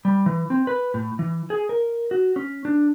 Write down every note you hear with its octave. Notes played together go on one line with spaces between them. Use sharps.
G3
E3
C4
B4
A2
E3
G#4
A#4
F#4
C#4
D4